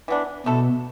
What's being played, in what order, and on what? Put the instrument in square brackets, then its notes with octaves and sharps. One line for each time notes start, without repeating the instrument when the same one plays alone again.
[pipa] E3 B3 D4
[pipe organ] B2 [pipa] A3 E4 A4